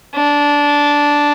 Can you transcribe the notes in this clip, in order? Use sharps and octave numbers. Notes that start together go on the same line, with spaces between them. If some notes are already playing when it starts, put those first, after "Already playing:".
D4